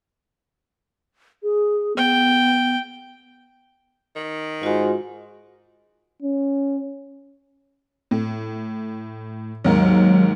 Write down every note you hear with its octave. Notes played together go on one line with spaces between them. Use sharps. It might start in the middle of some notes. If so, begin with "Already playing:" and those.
G#4
B3 G5
D#3
G#2 F4 F#4
C#4
A2
D#2 G#2 F#3 A#4